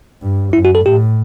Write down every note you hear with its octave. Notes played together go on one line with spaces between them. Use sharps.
G2
F#2 E4
F#4
A4
A2 G4